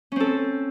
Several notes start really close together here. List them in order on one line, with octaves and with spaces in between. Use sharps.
C#4 C4 A4